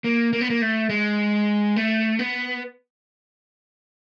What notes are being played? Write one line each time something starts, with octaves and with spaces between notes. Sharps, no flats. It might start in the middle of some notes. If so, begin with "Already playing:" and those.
A#3
A#3
B3
A#3
A3
G#3
A3
B3